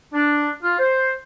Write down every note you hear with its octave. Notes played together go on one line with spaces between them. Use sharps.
D4
F4
C5